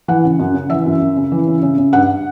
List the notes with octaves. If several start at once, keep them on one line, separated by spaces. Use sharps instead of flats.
E3 F#5
C#3
F#2
C#3
E3 E5
F#2
F#2
C#3
E3
C#3
C#3
C#3
G2 F#5